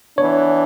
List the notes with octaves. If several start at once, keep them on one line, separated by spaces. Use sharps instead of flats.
E3 B3 D4 C#5